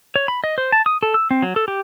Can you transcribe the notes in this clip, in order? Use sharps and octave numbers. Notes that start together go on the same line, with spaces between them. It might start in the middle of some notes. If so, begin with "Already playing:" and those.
C#5
B5
D#5
C5
A5
D#6
A4
E6
C4
F#3
A4
G4